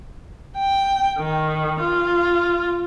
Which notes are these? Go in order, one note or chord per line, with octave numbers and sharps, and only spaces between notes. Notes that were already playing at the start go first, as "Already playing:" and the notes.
G5
D#3
F4